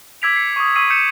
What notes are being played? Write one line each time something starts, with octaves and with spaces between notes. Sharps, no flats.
D6 E6 G#6 B6 D7 F7
C7 C#7
C#6 D#6
C#6 E6 B6 C7 D#7
G6 C#7 E7